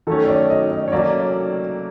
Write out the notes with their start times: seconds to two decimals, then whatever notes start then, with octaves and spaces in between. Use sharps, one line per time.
0.07 D#3 F#3 A3 C#4 A4
0.25 C#5
0.29 D5
0.50 D#5
0.71 D#5
0.88 C#5
0.92 F#3 A#3 C#4 D5